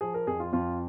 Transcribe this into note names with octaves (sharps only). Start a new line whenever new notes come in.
F3 G#4
A#4
F2 G#4
F4
F2 F4